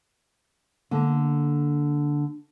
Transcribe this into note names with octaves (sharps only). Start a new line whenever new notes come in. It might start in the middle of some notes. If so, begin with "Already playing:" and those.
D3 A#3